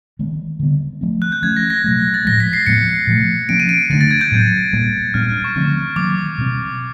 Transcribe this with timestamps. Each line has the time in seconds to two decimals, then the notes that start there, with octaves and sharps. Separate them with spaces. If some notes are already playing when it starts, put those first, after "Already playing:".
0.19 D#3 G#3 B3
0.60 D3 G3 B3
1.01 F3 A3 C4
1.22 F#6
1.32 G6
1.42 F3 A3 C#4 G#6
1.57 A#6
1.70 A#6
1.84 B2 F#3 A3
2.14 A6
2.25 A2 F3 G#3 A#6
2.40 B6
2.53 C7
2.66 A2 F3 G#3 B3 C#7
3.07 A#2 F3 A3
3.49 F3 A#3 C#4 D7
3.60 D#7
3.69 D7
3.90 D3 F3 A3 D4 A6
4.01 A6
4.11 G#6
4.21 G6
4.32 A2 F#3 B3
4.73 A#2 G3 A#3
5.14 A#2 G3 B3 D4 F6
5.44 C#6
5.56 D3 F3 A3 C4
5.96 D#3 F#3 A#3 D6
6.38 B2 G3 C4